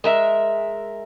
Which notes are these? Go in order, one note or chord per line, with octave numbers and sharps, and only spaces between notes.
G#3 A#4 E5